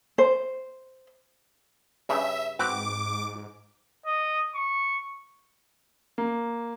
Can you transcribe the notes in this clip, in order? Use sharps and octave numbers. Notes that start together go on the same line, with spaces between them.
C5
G2 C#3 E5
G#2 C4 F#4 B4 D6
D#5
C#6
A#3